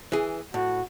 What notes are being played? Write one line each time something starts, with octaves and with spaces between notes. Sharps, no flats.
E3 G#4
A2 F#4